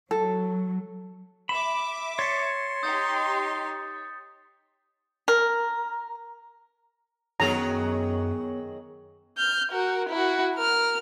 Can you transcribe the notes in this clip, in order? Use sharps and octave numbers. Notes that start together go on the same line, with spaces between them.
F#3 A4
E5 B5 D6 E7
C#5 C6 A6 B6 C#7
D#4 G4 D#6 G6 A6
A#4
F#2 D#3 F#3 B3 G#4 C#5 A#5
F6 G6
F#4 A#4
E4 F#4
A#4 F6